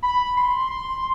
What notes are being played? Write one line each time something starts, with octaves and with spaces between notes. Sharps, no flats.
B5
C6
C6